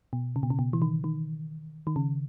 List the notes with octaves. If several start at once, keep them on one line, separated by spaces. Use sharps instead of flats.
B2
C#3
B2
C#3
B2
E3
D#3
D#3
D#3
C#3